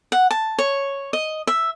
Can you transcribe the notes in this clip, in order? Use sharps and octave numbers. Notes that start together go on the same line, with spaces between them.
F#5
A5
C#5
D#5
E5